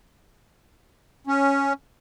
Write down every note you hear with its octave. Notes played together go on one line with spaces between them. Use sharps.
C#4